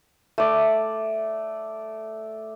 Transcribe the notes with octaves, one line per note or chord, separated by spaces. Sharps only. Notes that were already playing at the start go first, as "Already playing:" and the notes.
A3 D5